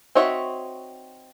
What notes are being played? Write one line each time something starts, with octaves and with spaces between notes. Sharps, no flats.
C4 D#4 F#4 C#5 E5